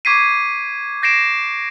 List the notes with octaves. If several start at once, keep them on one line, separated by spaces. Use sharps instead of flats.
C#6 D6 G#6 B6 C7 D#7
G6 A#6 C7 D7 E7